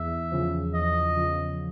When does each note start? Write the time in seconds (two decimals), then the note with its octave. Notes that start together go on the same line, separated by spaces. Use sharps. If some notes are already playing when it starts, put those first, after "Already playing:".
Already playing: E2 E5
0.31 C#3 F3
0.74 E2 D#5
1.17 C#3 F3